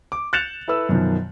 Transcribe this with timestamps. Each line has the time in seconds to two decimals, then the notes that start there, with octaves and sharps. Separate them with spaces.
0.12 D6
0.33 F#6 G6 A6 C#7 E7 F7
0.68 E4 A4 B4 E6
0.89 F#2 B2 D#3 F3